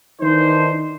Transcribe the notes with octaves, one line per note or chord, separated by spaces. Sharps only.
D#3 E3 D4 D#4 C5